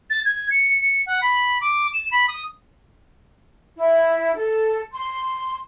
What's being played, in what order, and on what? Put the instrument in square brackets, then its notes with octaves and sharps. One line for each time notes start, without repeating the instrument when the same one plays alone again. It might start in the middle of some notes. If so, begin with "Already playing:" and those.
[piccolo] A6
G#6
C#7
C#7
F#5
B5
D6
E7
B5
D#6
[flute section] E4
A4
C6